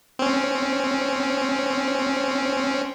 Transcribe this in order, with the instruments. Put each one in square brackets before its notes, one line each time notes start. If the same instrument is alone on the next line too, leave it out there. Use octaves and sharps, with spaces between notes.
[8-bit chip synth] C4 C#4